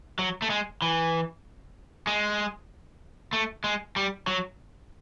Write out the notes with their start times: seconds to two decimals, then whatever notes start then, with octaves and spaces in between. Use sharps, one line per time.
0.19 F#3
0.42 A3
0.50 G#3
0.82 E3
2.07 G#3
3.33 A3
3.64 G#3
3.96 G3
4.27 F#3